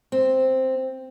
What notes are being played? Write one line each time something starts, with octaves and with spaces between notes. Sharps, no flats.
C4